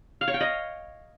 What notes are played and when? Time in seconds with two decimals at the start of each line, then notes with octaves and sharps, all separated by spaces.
0.21 F5
0.28 C#5
0.34 G5
0.41 D#5